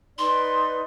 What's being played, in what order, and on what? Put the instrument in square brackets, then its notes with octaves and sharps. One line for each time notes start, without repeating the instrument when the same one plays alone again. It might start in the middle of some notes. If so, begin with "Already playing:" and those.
[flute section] D#4 B4 D5 [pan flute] C6